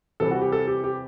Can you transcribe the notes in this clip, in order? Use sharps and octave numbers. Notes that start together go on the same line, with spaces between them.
C3 E3 G3 A4
F#4
G4
A4
G4
G4